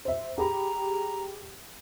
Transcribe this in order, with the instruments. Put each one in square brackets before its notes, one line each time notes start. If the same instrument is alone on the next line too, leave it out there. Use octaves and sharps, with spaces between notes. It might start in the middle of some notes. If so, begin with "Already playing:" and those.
[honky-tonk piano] C5 E5
[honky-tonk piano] G4 G#4 B5 [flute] A#5